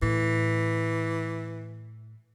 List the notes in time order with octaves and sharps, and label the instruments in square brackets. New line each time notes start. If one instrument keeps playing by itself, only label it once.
[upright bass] A2 [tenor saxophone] E3